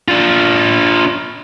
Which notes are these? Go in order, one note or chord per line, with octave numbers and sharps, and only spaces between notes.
D4 F4